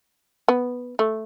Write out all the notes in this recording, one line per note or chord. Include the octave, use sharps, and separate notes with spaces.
B3
A3